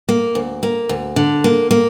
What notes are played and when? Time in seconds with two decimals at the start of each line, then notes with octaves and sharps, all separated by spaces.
0.09 A#3
0.35 D2
0.63 A#3
0.89 D2
1.16 D3
1.44 A#3
1.71 A#3